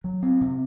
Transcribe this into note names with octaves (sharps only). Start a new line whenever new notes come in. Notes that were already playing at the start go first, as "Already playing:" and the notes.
F#3
C4
C3